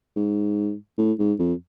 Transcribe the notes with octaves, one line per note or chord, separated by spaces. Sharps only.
G#2
A2
G#2
F2